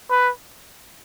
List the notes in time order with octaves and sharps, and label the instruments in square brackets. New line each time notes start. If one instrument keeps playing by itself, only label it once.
[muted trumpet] B4